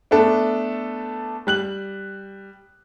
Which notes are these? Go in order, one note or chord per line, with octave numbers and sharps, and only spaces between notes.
A3 B3 D4 A4
G3 F#6 F#7